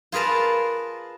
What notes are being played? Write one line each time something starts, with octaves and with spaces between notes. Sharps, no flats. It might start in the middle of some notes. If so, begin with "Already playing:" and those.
F4 G#4 A#4 B4 A5